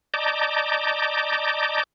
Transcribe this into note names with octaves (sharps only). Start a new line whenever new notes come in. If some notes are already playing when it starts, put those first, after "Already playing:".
D5 D#5 A5 A#5 D6 G6